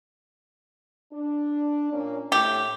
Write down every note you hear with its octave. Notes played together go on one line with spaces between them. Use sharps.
D4
A#2 A#3 C#4
A2 G4